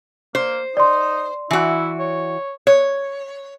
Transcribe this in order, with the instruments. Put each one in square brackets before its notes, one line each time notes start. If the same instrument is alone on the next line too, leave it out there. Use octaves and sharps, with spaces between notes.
[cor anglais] A#3 [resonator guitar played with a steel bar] C5
[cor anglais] D#4 [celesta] D5 C6
[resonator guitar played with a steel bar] E3 F#4 [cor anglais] E4
[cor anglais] C#5
[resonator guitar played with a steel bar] C#5